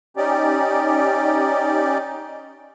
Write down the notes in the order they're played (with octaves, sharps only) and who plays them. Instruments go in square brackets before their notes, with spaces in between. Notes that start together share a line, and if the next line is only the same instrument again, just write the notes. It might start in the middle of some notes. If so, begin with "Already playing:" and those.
[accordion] C#4 D#4 G4 D5